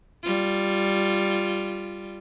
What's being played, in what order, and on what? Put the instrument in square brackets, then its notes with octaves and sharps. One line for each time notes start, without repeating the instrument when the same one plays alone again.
[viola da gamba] G3 F4